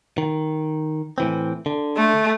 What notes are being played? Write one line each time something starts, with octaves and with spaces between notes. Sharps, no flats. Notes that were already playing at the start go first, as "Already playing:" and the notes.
D#3
A2 E3 C4
D3
A3